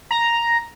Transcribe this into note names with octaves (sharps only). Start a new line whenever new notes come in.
A#5